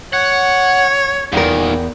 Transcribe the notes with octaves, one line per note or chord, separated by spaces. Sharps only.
C#5 F#5
E2 A#2 D#3 A#4